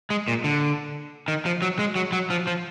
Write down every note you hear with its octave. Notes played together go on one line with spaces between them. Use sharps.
G#3
A#2
D3
D#3
F3
F#3
G#3
F#3
F#3
F3
F3